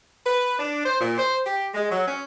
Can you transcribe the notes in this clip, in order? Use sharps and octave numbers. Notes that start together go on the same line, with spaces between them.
B4
D4
C5
A#2
C5
G4
G#3
F#3
C#4